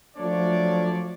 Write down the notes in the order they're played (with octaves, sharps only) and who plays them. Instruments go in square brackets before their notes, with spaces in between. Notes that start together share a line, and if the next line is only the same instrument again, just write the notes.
[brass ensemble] F3 F#3 A3 D4 C#5 D5